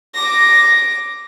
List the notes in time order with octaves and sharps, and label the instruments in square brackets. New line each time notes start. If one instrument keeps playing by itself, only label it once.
[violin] D6 A#6